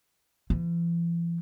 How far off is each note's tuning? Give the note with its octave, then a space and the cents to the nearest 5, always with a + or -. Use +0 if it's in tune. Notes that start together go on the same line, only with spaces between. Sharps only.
E3 +45